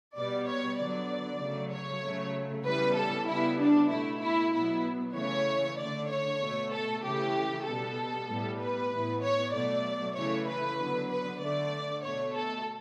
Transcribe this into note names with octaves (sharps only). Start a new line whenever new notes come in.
B2 G3 B3 D5
C#5
D3 F#3 B3 D5
C#3 F#3 A3
C#5
C#3 F#3 A3
C#3 E3 G3 B3 B4
A4
C#3 G3 B3 E4
D4
B2 A3 E4
E4
B2 F#3 B3 E4
C#3 E3 A3 C#5
D3 A3 D5
C#5
B2 A3
A4
C#3 E3 A3 G4
B2 G3 B3 A4
A2 G3 B3
B4
A2 E3 B3
C#5
B2 F#3 A3 D5
C#3 E3 A3 C#5
B4
D3 F#3 B3
B4
D3 A3 D5
B2 A3 C#5
A4